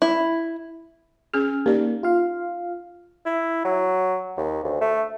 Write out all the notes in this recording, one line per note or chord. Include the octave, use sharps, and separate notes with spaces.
E4
C#4 G#4 F6
A#3 D#4 G4 D5
F4 F5
E4
F#3
D#2
D2
A3